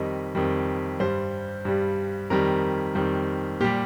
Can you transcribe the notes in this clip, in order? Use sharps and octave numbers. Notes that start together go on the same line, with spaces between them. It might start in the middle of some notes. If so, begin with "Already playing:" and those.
Already playing: F2 D#3 G3 D#5
F2 D#3 G3
G2 G3 C5
G2 G3
F2 D#3 G3 A#4
F2 D#3 G3
A#2 G3 G4